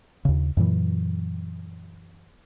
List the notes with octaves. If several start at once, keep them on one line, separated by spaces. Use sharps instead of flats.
D#2 C#3
F#2 A#2 E3 F#3